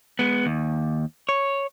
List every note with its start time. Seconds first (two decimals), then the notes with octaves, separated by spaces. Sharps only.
0.19 G#3 B3
0.46 D#2
1.29 C#5